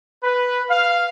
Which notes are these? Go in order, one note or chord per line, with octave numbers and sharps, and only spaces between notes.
B4
F5